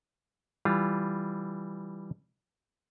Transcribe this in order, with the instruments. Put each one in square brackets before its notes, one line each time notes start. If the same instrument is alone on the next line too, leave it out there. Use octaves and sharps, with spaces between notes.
[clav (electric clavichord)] E3 G3 F4